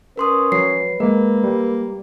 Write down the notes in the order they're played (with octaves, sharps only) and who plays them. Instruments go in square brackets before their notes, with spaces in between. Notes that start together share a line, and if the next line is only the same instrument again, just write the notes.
[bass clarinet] C#4 [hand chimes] A#4 C6 D#6 [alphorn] B4
[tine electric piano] F#3 [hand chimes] C7
[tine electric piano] G#3 [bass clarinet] A#3 [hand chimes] A#4
[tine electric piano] G3